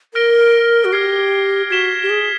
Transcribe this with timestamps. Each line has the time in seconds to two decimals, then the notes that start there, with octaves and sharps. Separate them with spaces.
0.14 A#4 F6 A#6 D7 G7
0.85 F#4
0.92 G4 F6 G#6 C7
1.70 F#4 G#6 B6 E7 G7
2.03 G4
2.10 G#4